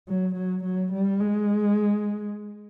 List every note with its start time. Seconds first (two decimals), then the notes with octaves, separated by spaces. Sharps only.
0.09 F#3
0.36 F#3
0.64 F#3
0.93 G3
1.21 G#3